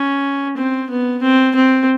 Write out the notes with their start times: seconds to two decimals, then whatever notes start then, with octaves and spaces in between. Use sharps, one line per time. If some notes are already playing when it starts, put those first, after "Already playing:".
Already playing: C#4
0.57 C4
0.90 B3
1.22 C4
1.55 C4